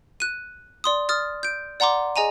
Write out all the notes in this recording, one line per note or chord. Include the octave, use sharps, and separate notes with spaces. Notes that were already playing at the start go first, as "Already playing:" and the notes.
F#6 D#7
D5 C6 D#6
D#6 F6 A6
G6 D7
D5 F#5 A#5 C6 D6
G#4 D#5 G#5 A#5 D#7